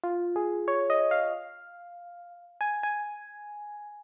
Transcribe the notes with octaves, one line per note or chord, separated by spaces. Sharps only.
F4
G#4
C#5
D#5
F5
G#5
G#5